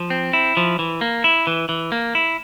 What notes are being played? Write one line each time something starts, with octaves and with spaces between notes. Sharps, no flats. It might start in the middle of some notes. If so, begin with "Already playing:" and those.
Already playing: F3
C4
E4
F3
E3
A#3
E4
E3
E3
A#3
E4